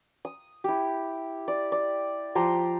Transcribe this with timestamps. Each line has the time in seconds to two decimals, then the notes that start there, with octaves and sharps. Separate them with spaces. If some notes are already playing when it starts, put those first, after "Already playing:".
0.25 D#6
0.64 E4 G4
1.48 D5
1.72 D5
2.35 F3 G4 A#5 C6